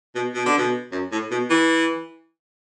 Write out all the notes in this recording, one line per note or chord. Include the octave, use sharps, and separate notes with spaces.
B2
B2
D3
B2
F#2
A2
B2
E3